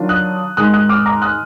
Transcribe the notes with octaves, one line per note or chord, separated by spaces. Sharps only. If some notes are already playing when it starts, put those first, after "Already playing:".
Already playing: D#3 F#3 D4 F4
D#6 F#6
G#2 D#3 G#3 D#4 D#6 F#6
D#6 F#6
D6 F6
A#5 D6
D#6 F#6